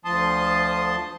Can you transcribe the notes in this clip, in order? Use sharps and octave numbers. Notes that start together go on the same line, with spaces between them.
D2 F3 A5 C6 D#6